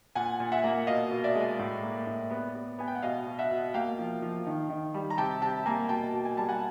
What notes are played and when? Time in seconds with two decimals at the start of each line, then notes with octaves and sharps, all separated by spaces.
0.15 A#2 F#5 G#5
0.40 A#2
0.52 E5 F#5
0.64 A#3
0.87 B2 D#5 F5
1.11 B2
1.24 D5 E5
1.35 G#3
1.59 A2
1.83 A#3
2.07 A2
2.31 B3
2.55 B3
2.79 B3 G#5
2.88 G5
2.95 F#5
3.03 B2 D#5 F5
3.27 B2
3.39 E5 F#5
3.51 B2
3.74 A#3 F5 G5
3.98 F3
4.22 F3
4.47 D#3
4.70 D#3
4.94 G3
5.10 A#5
5.18 C3 G5 A5
5.42 C3 G5 A5
5.66 A#3 G#5 A#5
5.89 B2 G5 A5
6.13 B2
6.25 G#5
6.37 G3 A5
6.49 F#5 G#5